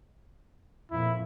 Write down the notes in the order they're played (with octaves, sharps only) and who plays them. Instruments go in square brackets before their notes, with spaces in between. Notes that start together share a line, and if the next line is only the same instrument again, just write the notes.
[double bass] F2 A#2 [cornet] E4